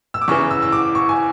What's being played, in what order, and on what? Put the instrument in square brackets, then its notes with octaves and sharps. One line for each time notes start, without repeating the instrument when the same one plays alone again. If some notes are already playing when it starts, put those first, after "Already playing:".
[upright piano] E6
D6
E2 C#3 E3 C#6
E6
E6
D6
C#6
G#5